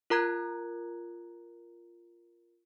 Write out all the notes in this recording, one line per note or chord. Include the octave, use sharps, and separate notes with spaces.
F4 A#4 A#5 F#6 G#6